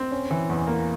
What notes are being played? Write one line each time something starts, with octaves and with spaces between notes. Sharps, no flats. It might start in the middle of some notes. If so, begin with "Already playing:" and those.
Already playing: C4
C#4
E3
E2
A#3